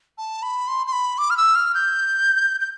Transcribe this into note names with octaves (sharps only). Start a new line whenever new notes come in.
A5
B5
C6
C6
B5
D6
F6
E6
F6
G6
G6